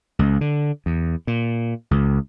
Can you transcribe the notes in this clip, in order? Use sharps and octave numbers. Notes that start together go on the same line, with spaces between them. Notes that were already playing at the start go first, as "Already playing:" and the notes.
C#2
D3
E2
A#2
C#2